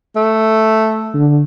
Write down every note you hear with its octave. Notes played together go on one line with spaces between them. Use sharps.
A3
D3